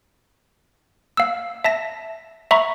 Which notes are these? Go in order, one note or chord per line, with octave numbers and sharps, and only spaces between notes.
F5 E6
E5 A5 A#6
E5 A#5 B5 C#6